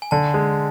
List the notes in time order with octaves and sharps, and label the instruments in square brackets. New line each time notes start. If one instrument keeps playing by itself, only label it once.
[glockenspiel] G#5
[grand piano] D3 [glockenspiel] A5
[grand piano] G#3